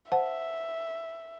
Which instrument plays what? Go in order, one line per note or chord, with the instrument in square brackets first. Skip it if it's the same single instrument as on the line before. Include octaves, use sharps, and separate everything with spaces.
[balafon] C5 F#5 A5 [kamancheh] E5